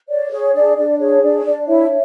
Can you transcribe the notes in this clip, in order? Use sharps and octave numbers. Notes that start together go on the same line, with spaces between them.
C#5 D5
G#4 C#5
D4 D5
D4 D5
G#4 C#5
D4 D5
C#5
D4 D5
E4 C#5 E5